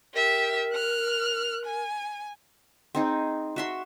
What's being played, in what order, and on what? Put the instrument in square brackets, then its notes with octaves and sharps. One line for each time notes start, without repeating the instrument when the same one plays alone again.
[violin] G4 E5 [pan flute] A#4
[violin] F6 F#6
G#5
[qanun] C4 D#4 G#4
F#4 E5 C6